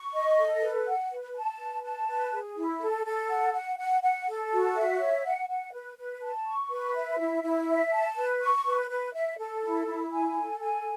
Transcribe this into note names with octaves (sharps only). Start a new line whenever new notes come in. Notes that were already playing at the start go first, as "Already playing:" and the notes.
Already playing: C#6
D#5
A4
B4
F#5
B4
A5
B4
A5
B4
G#4
E4
A4
A4
F#5
F#5
F#5
F#5
A4
F#4
E5
C#5
F#5
F#5
B4
B4
A5
C#6
B4
E5
E4
E4
E5
A5
B4
C#6
B4
B4
E5
A4
E4
E4
G#5
A4
G#5